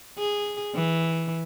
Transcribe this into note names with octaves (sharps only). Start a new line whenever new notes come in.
G#4
E3